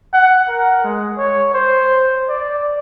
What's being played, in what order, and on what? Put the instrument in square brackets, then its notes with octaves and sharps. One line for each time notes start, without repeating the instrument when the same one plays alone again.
[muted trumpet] F#5
A#4
G#3
C#5
C5
D5